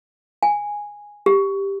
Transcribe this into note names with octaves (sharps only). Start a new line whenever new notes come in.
G#5
G4